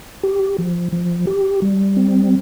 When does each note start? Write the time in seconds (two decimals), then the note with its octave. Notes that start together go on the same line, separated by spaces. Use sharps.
0.23 G4
0.58 F3
0.92 F3
1.27 G4
1.62 G3
1.97 C4